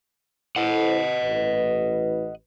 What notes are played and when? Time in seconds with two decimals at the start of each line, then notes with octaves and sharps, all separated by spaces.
0.56 E4 A4 C5 D#5 F#5
1.21 A1 B4